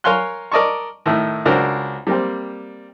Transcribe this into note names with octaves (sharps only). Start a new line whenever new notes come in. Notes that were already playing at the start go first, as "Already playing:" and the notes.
A#4 C#5 F5 G#5 C6 F#6
A#4 D5 D#5 A5 C#6
A2 D#3 A3
C#2 D4 F#4 A#4 C5 A#5
G3 A#3 C4